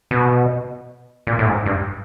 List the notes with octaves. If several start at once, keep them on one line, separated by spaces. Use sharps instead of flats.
B2
A#2
A2
G#2
G2